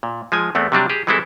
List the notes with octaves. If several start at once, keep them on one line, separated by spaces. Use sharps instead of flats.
A#2
F3 G#3 G#5
E2 A3 B3 C4
C3 F#3 G3 D4
G4 G#4
E3 G3 G#3 C4 E4 A4